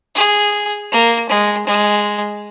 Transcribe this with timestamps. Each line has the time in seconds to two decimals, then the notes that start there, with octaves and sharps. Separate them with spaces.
0.15 G#4
0.92 A#3
1.30 G#3
1.67 G#3